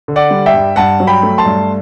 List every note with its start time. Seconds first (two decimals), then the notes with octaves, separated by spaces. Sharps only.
0.08 D3
0.16 D5 F#5
0.31 G3
0.46 E5 G5
0.54 G2
0.76 G2 F#5 A5
1.00 F#3
1.07 G5 B5
1.23 A3
1.38 A5 C6
1.45 G2